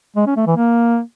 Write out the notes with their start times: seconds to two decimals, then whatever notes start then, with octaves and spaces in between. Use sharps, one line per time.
0.16 G#3
0.26 C#4
0.37 A3
0.47 E3
0.57 A#3